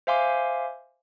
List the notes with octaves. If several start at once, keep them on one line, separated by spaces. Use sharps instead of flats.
C5 E5 F5 G#5 C6 D6